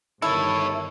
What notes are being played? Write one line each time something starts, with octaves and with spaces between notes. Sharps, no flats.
G1 D#3 E4 A4 C#5